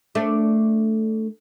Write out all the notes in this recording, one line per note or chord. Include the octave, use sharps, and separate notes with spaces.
A3 D4